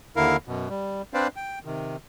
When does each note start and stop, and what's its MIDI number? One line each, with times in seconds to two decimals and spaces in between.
0.16 0.36 39
0.16 0.36 50
0.16 0.36 64
0.16 0.36 70
0.16 0.36 77
0.47 0.68 42
0.47 0.68 47
0.69 1.02 55
1.14 1.28 60
1.14 1.28 62
1.14 1.28 71
1.14 1.28 72
1.14 1.28 74
1.14 1.28 77
1.36 1.59 79
1.65 1.96 48
1.65 1.96 51